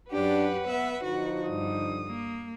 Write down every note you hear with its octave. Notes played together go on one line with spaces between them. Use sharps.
F#2 D4 G4 B4 F#5
B3 E5
D3 F3 D#4 F#4
G2 D#6
A#3